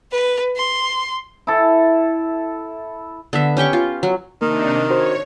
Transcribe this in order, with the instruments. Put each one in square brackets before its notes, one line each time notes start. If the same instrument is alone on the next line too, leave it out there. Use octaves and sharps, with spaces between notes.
[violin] B4
C6
[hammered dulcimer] E4 A4
[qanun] D3 B3 E5
C#4 G4 G5 C#6
F4
F#3
[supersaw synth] C3 D4 D#4 [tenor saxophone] D#3 [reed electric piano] A#3
[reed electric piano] F#4 C5 [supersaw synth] C#5